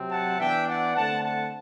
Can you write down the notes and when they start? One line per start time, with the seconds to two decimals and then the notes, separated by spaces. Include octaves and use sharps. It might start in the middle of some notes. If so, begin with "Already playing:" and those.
Already playing: C3 F#3 C4
0.11 F#5 A5
0.38 E3 B3 D4 E5 G5
0.66 D5 F#5
0.94 D3 A3 C4 F#5 A5
1.23 F#5 A5